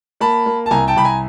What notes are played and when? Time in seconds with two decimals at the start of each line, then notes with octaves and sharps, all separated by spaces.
0.21 A#3 A5 B5
0.46 A#3
0.66 A5
0.71 C2 G#5 A#5
0.88 G5 A5
0.97 C2 B5
1.04 G#5 A#5